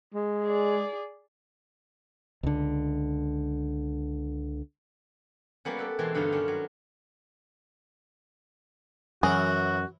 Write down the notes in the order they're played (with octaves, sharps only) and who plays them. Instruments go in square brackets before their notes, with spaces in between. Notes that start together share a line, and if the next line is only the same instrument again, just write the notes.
[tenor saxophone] G#3
[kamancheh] G#4 D5
[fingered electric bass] C#2 D3
[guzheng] G3 A#3 B3 C#4
A4 B4 D5
B2 E3 G#3 C4 A5 C6
G2 D3 B3 D#4 F4
D#3 C#4 D4
F#3
[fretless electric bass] F#2 [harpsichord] E3 F#3 A#4 [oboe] F#4 [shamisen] G#4